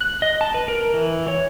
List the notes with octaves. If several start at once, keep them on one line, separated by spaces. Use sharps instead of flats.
F#6
D#5
A5
B4
A#4
E3
C#5